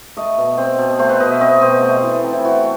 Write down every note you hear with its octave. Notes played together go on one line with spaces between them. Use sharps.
A3 D#5
B2
C4
B2
A3 C5
B4
B2 D#5
E5
C4 D#5
B2 C5
A3 D#5
C5
E3
B4
C4 A4
E4
E3 F#4